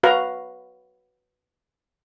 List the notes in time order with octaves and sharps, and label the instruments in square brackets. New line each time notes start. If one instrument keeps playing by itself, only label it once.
[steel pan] F#4 B4 F5 A#5